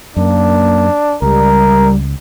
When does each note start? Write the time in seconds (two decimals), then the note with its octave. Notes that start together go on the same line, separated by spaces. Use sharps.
0.17 F#2 A#3 D4
1.22 C#2 G3 A#4